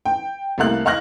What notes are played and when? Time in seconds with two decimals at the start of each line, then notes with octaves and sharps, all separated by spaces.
0.05 G5
0.58 C2 A3 A#3 F5 F#6
0.85 D#5 F5 C#6 F6 F#6 A#6